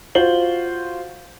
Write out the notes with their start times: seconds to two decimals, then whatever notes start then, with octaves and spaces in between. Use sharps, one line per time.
0.15 F4 F#4 C5 F#7 G7